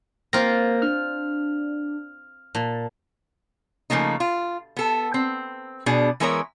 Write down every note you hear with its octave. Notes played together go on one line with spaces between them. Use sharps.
A#3 C4 F4 A#4 A#6
D4 F6
A#2 A5
C#3 F3 A3 A#3 D#4
F4
B3 A4
C4
B2 D4 G#4
E3 G#3 B3 A#4 C5 C#5